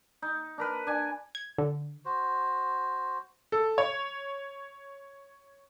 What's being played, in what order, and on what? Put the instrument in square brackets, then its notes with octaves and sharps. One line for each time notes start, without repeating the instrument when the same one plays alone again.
[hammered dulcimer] D#4
D4 A#4 B4
D4 G#5
[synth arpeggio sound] G#6
D3
[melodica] F#4 C5
[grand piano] A4
C#5